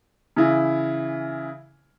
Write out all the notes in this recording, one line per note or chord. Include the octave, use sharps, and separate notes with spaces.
C#3 E3 E4